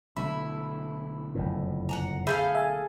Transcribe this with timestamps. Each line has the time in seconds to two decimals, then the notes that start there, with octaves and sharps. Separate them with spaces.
0.17 B1 D3 A3 E4 B5
1.35 F#1 F2 A2
1.89 F#5 A5 A#5
2.27 G#4 A4 E5 F5 B5 G6
2.55 E5 G#5